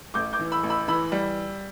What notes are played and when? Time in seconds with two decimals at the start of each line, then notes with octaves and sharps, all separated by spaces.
0.14 A1 D6 G6
0.33 D6 G6
0.39 E3
0.52 B5 E6
0.63 A1
0.70 B5 E6
0.88 E3 B5 E6
1.12 G3